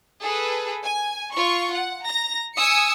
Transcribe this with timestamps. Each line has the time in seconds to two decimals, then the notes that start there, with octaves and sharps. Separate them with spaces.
0.22 G#4 A4 B4
0.83 G#5
1.33 F4 C#6
1.72 F#5
2.04 A#5 A#6
2.54 G#5 D#6 E6 C#7